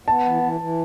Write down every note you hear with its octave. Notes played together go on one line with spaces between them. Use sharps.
B3 A5
E3
E3
E3